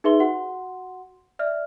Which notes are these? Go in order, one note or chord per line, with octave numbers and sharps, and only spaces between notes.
D#4 G#4 B4 E5 C6 G7
F#4 F#5 C6
D5 E5 F6